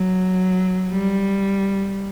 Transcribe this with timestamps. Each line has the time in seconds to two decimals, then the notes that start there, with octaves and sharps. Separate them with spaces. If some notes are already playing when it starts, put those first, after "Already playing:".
Already playing: F#3
0.92 G3